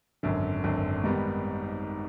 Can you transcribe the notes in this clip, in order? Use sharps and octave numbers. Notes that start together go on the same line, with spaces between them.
G#1 F#2 D3
G#1 F#2 D3
G#2 D#3 G3 B3